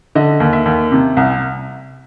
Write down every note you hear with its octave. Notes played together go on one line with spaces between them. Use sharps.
D3 D#5
D#2
E5
D#2
C3
C2